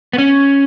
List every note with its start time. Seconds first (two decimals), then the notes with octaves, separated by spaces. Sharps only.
0.13 B3
0.18 C#4